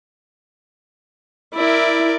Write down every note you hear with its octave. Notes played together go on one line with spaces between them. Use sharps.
E4 A#4 D5